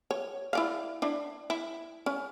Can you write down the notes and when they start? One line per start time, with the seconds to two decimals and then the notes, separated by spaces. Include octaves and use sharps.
0.11 C#5
0.53 E4 D5 F5
1.02 D4 E4
1.50 E4
2.06 C#4